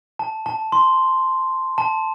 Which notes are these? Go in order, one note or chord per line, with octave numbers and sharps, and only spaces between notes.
A5
A5
C6
A5